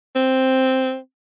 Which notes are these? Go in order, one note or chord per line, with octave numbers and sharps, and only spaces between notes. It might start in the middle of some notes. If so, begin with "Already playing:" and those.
C4